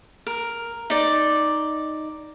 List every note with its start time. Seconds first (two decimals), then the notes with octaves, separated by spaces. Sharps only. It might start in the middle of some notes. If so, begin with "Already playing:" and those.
0.27 A#4
0.90 D#4 D5